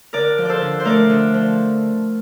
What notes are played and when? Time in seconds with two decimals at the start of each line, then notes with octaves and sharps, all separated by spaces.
0.13 D3 A#4 D5
0.38 F3
0.45 A4 C5 D5
0.61 D3
0.80 C5
0.85 A3 A#4 D5
1.10 D3
1.34 F3